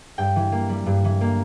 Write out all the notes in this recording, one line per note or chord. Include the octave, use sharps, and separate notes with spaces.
G2 G5
E3
A#3
G3
G2
E3
A#3